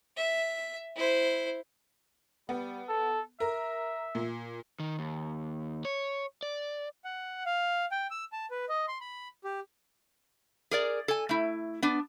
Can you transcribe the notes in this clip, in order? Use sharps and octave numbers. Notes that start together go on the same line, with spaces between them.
E5
E4 C5
G3 B3
A4
A#4 E5
A#2
D#3
D#2
C#5
D5
F#5
F5
G5
E6
A5
B4
D#5
C6
B5
G4
G#4 A#4 D5
A4 G#5
A3 E4
B3 D4